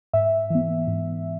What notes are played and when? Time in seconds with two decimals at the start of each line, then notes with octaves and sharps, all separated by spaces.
0.13 G#2 E5
0.50 E3 B3
0.87 G#2